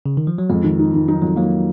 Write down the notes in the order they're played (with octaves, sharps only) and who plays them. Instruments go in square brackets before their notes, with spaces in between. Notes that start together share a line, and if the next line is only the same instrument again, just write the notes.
[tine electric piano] C#3
D#3
F3
F#3
[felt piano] F2 [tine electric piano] G#3
[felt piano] D#3
D#4
D#3
[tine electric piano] F#3 [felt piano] D#4
[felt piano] F2 [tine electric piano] F#3
[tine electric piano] F#3 [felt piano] A#3